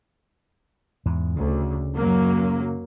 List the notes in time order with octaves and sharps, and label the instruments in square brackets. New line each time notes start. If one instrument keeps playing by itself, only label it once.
[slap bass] E2 G#2
[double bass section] D2 [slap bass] C#3
[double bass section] F#2 F#3 A#3